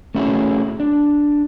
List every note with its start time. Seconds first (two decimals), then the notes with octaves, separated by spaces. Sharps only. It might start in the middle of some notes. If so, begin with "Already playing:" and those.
0.15 A3 C#4 E4 F#4 G#4
0.80 D4